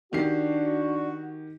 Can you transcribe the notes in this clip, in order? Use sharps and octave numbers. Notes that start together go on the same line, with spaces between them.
D#3 D4 F#4 G4 C7